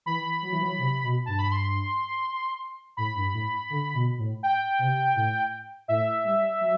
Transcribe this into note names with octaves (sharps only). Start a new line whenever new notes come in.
E3 B5
F#3
E3
F#3
C3
B2
G2 A5
B5
C6
A2 B5
G2
A2
D3
B2
A2
G5
C3
A2
A2 E5
G3
F#3